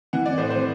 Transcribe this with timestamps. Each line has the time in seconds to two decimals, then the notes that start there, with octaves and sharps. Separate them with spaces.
0.13 E3 F#5
0.26 D5
0.38 A2 C5
0.50 C5